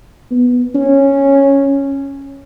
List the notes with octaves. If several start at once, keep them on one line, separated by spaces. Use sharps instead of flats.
B3
C#4